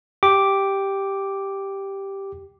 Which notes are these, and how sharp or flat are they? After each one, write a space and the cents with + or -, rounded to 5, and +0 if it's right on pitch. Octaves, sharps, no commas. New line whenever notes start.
G4 +0 D6 +0